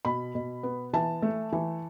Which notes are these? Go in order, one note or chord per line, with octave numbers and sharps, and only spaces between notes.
B2 B5
B2
B3
E3 A5
A3
E3